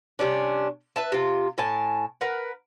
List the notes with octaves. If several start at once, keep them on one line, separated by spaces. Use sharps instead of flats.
C3 G3 C#4 D4
B4 E5 A5
C3 F4
A2 G#5 A5
A#4 B4 F#5